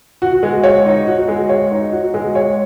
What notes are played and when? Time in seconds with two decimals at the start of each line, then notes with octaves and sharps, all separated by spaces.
0.22 F#4
0.43 G#3
0.64 C#5
0.86 D#4
1.07 F#4
1.28 G#3
1.49 C#5
1.72 D#4
1.92 F#4
2.14 G#3
2.35 C#5